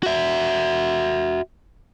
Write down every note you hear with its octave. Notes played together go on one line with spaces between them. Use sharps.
F#4 E5